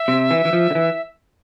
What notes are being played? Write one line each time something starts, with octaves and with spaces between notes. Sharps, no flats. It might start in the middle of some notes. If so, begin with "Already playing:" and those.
Already playing: E5
C3
E3
E3
F3
D3
E3